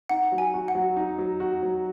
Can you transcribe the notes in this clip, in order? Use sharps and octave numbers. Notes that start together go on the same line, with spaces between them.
D#4 F#5
F#3
G#5
F#4
F#5
F#3
D#4
F#3
F#4
F#3